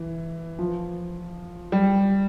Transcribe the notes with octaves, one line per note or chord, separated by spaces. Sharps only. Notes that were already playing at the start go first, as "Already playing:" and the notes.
Already playing: E3
F3
G3